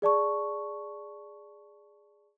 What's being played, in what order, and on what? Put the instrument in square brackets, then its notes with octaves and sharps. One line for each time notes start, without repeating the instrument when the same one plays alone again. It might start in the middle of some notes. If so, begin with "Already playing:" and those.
[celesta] G#4 D5 A5 C#6